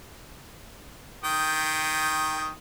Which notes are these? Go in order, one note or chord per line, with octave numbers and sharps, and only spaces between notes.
D#3 G5 D#6